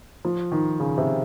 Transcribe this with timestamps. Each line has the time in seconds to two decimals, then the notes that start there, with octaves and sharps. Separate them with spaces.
0.25 F3
0.52 D#3
0.80 C#3
0.98 C3